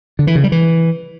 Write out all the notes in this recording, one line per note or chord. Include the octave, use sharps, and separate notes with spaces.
D3
E3
C#3
G3
E3